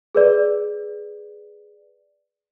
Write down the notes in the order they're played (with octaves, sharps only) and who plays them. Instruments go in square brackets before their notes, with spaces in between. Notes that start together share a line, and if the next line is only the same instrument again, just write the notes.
[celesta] G#4 B4 D5